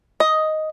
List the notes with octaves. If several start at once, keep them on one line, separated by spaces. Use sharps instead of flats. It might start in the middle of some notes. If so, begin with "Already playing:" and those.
D#5